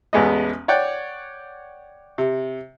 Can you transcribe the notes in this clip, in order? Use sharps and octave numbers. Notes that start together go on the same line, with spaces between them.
A1 E2 G#3 B3 D#5
C#5 D5 F#5 G5
C3